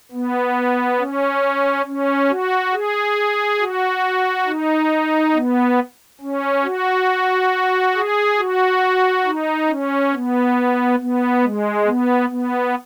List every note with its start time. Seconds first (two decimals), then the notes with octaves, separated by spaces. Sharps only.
0.12 B3
0.99 C#4
1.86 C#4
2.29 F#4
2.73 G#4
3.60 F#4
4.46 D#4
5.34 B3
6.21 C#4
6.64 F#4
7.95 G#4
8.39 F#4
9.25 D#4
9.69 C#4
10.13 B3
11.00 B3
11.43 G#3
11.87 B3
12.30 B3